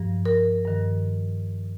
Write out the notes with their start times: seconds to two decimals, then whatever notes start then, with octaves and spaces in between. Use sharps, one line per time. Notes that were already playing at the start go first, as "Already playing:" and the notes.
Already playing: G2 F3
0.25 A#4
0.65 G2 D#3